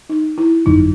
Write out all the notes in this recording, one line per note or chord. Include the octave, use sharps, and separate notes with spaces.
D#4
E4
G1 F2 D3 F#3 D#4